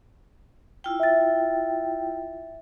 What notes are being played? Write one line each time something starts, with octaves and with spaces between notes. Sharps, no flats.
E4 F4 G5
E5 A6